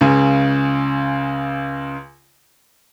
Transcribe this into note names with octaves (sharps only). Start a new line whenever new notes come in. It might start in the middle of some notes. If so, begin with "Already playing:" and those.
C#2 C#3 G#5